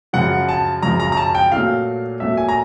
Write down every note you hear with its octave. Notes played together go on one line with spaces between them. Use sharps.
F#2 C#3 F3 F#5
A5
F#2 C#3 F3 A#5
A#5
A#5
A5
G5
A#2 F#3 A3 F5
A#2 F#3 A3 E5
G#5
A#5